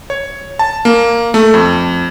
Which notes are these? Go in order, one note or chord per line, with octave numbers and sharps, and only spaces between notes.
C#5
A5
A#3
A3
F2